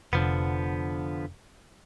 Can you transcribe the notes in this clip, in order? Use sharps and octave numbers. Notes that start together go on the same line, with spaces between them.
F1 D3 F3 B3